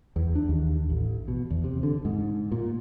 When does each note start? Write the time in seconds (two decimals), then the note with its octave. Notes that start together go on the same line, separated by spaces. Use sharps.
0.16 E2
0.35 D4
0.49 D#2
0.90 A1
1.28 B2
1.50 E2
1.64 C3
1.83 D3
2.05 G#2
2.52 A#2